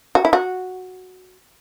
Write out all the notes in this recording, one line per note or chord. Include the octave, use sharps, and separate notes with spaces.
F#4
E4
F#4